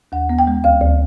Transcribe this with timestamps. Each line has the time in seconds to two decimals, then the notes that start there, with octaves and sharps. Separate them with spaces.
0.12 D#2 F#5
0.30 B3
0.39 G5
0.47 G#3
0.64 D2 F5
0.81 D2